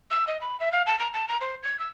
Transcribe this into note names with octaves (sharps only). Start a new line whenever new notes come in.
E6
D#5
B5
E5
F5
A5
A#5
A5
A#5
C5
G#6
E6